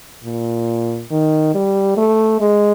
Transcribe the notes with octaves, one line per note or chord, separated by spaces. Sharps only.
A#2
D#3
G3
A3
G#3